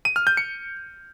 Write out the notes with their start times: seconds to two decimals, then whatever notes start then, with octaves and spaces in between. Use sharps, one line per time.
0.05 D#7
0.16 F6
0.27 G6
0.37 C#7